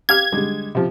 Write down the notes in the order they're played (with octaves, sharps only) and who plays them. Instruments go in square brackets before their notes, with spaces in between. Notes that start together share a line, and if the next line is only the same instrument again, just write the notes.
[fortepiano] G4 F5 F6 [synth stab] G#6
[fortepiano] D3 G3 G#3
C3 F3